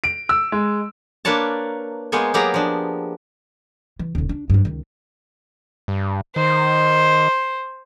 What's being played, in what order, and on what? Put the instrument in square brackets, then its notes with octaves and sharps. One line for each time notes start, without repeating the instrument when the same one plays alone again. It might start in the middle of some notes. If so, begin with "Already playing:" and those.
[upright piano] D7
E6
G#3
[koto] A#3 D4 B4 C#5 A5
G#3 A#3 B3 C5 C#5 G#5
F#3 A#3 B3 G4 G#4 A#5
F3 D4
[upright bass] E3
D#1 D3
D4
G2 F3
C#2 D#3
[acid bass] G2
[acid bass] D#3 [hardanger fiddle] C5